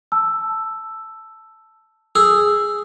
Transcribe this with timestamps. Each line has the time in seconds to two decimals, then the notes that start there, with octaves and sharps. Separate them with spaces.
0.12 A5 E6
2.15 G#4 E6